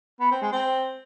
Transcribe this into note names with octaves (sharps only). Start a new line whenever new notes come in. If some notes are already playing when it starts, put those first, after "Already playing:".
B3
C4
G#3
C4